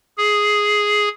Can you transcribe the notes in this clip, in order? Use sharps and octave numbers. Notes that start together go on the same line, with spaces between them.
G#4